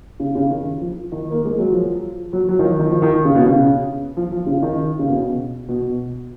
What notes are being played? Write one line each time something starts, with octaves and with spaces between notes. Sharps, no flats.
C#3
C#3
D#3
F3
D#3
A#3
G#3
F#3
F3
F#3
F#3
D#3
F3
D#3
F3
D#3
C#3
B2
C#3
F3
F3
C#3
D#3
C#3
B2
B2